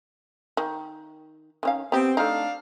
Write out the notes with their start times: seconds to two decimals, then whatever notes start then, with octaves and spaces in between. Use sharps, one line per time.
0.57 D#3
1.63 D#3 C#4 F5
1.92 B3 C4 G4
2.17 A3 D4 D#4 F5